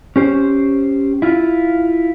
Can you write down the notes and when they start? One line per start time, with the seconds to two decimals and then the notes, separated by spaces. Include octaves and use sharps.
0.16 C#4 G4 C5
1.22 E4 F4